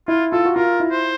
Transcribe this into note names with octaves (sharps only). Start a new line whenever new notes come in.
E4 F4
F4 A4
F#4
F4 A#4
E4
C5